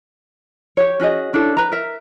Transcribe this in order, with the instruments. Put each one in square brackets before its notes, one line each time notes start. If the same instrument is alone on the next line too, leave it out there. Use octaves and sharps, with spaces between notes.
[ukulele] G4 C#5
C#4 F#4 G#4 D#5
C#4 D4 E4 A4
B4 A#5
A#4 E5